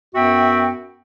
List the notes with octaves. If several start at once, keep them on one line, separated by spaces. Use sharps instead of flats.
F#2 B3 F#4 E5 G5